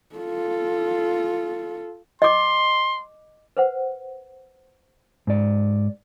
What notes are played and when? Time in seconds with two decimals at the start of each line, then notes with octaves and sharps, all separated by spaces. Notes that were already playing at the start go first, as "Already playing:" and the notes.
0.16 F4 A4
2.22 D#5 C6 D6
3.57 B4 C5 F#5
5.27 G#2 D5